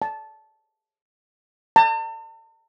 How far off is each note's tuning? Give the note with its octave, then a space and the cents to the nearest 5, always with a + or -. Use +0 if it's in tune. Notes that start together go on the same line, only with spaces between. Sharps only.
A5 -10
A5 +40